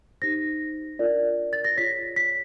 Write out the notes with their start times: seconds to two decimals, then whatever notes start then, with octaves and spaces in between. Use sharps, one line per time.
0.22 D#4 G4 C5 A#6
0.99 D4 F4 A#4 D5
1.53 A6
1.65 A#6
1.76 F4 G#4 C#5 B6
2.16 B6